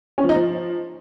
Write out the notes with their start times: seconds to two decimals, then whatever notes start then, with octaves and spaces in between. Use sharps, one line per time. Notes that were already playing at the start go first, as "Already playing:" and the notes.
0.18 C#4
0.23 F3
0.29 D#4
0.35 F3